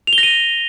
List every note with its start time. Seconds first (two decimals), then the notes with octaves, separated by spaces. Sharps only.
0.07 F7
0.13 G7
0.18 A#6
0.23 D#7